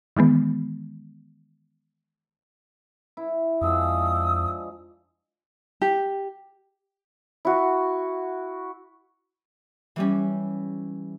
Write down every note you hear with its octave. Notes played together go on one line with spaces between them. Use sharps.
D#3 E3 G#3 B3
E4
F2 F3 G#3 D4 D#6 E6
G4
E4 F#4
E3 G3 C#4